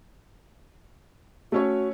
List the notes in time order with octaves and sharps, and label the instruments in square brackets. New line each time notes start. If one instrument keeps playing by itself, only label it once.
[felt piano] A3 C#4 C#5 [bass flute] F#4